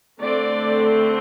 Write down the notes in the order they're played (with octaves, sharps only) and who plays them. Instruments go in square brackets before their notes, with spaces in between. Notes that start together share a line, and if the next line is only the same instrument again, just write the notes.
[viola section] D3 A3 C4 D5